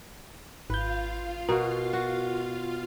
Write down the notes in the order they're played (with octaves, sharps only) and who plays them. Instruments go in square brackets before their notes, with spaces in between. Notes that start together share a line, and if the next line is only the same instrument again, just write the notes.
[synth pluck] G#1 G6 [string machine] F4 F5 [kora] B4
[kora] B2 F#4 [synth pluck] A#4
[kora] F#4